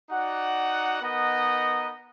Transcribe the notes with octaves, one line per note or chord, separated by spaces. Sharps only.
D#4 F#4 D5 F#5
B3 D#4 A#4 D#5 F#5